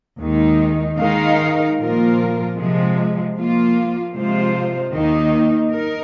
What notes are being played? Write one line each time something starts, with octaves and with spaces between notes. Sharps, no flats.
D#2 D#3 G#3 D#4
D#3 G#3 D#4 A#4 F5
A#2 F3 A#3 F4 A#4
C3 F3 G#3
F3 A#3 F4
C3 F3 G#3 F4 C5
D#2 D#3 A#3 D#4
D#4 A#4